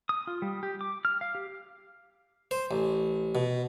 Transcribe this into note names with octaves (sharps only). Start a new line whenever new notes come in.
D#6
F4
G3
G4
D6
F6
F5
G4
C5
A1
B2